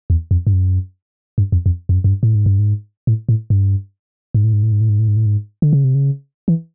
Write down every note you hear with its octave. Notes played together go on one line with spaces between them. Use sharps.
E2
F2
G2
F#2
G2
F2
F2
F2
F#2
F#2
G2
A2
G#2
G2
G#2
A2
A2
G2
G#2
A2
G#2
A2
G#2
A2
G#2
A2
G#2
A2
G#2
D3
C#3
C3
C#3
E3